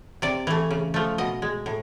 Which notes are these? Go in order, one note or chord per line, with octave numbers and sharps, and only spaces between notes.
C3 D5
E3 A3
C#3
F3 A3
B2 D#5
G#3
A2